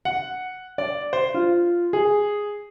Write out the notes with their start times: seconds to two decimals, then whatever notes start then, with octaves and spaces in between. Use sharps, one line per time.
0.05 F#5
0.78 D5
1.13 C5
1.34 F4
1.93 G#4